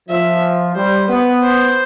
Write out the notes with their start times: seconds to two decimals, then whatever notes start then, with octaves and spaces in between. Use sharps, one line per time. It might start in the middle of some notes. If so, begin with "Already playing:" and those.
0.09 F3 E5
0.76 G3 C5
1.09 B3 B4
1.43 C5